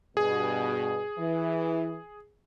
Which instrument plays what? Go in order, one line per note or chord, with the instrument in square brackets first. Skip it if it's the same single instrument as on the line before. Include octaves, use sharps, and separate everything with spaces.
[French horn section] G2 B2 [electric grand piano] G#4
[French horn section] E3